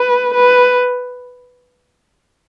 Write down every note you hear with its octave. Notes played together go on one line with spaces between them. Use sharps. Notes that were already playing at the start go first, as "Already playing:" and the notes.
Already playing: B4
B4